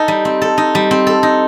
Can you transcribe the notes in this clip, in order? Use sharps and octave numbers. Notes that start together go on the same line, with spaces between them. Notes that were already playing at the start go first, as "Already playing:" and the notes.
Already playing: D#4 A4
G3
C4
A4
D#4
G3
C4
A4
D#4